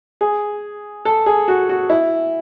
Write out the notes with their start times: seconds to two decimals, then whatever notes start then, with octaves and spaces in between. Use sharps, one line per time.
0.21 G#4
1.05 A4
1.26 G#4
1.48 F#4
1.69 F#4
1.90 E4